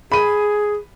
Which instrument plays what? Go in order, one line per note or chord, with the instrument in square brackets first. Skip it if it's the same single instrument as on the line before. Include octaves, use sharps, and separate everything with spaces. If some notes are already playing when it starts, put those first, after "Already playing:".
[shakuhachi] G#4 [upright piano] B5 D#7